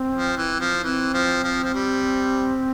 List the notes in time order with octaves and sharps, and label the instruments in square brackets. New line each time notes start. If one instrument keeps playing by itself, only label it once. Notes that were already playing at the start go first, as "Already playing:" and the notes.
Already playing: [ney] C4
[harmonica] F3
E3
F3
[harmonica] E3 [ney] C4
[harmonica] F3
F3
F3
G3